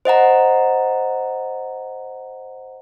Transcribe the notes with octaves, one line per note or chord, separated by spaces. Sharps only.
C5 D#5 F#5 A#5